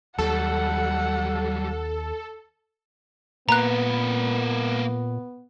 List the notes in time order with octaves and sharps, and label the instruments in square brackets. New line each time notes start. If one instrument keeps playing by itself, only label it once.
[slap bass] D#2 [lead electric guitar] F#3 G3 [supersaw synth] A4 [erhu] F#5
[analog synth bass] A#2 [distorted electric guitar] A#3 B4 [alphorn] B3 [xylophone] A#5 F#6